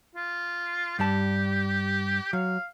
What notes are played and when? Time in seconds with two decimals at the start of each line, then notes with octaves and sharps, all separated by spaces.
0.15 F4
0.99 G2 G3 G4 A5
2.33 F#3 F5